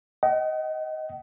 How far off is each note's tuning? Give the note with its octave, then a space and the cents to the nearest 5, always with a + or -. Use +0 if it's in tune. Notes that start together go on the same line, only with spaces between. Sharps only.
D#5 +15 F#5 +45